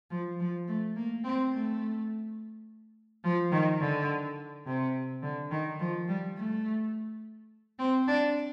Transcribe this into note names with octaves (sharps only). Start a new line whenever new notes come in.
F3
F3
A3
A#3
C4
A3
F3
D#3
D3
C3
D3
D#3
F3
G3
A3
C4
D4